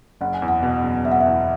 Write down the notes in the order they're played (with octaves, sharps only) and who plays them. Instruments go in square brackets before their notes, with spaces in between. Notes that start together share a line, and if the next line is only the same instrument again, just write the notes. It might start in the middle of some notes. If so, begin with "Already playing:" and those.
[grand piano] F#1 [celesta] F#5
[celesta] G#5
[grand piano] E2
[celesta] F#5
[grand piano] B2
F#1
[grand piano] F#1 [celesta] E5
[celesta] F#5
E5
[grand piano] E2